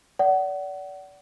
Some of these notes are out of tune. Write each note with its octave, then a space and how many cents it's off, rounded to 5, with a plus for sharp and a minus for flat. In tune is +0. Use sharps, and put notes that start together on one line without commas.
D5 -30 F#5 +25